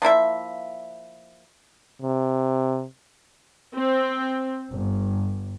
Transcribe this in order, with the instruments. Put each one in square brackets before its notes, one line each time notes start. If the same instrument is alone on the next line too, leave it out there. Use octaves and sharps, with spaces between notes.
[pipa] F3 A#3 E4 E5
[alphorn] C3
[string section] C4
G1